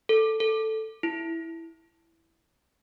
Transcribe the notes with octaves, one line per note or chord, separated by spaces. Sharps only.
A4
A4
E4